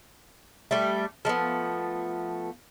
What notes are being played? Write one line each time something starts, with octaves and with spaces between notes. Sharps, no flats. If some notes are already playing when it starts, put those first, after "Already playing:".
G3 A3
F3 G#3 A3 B3